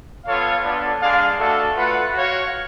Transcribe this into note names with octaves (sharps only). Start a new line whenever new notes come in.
B3 F4 A4 C#5 F5
B3 D4 F4 A4 D5
G#3 D4 G#4 D5 F5
A3 D4 F#4 A4
A3 F4 B4 F#5
F#4 C#5 F5